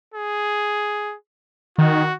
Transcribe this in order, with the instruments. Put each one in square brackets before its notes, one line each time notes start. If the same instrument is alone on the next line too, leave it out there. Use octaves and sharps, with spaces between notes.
[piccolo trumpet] G#4
[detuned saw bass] D#3 [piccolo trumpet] F#4